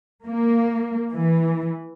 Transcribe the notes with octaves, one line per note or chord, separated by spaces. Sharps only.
A#3
E3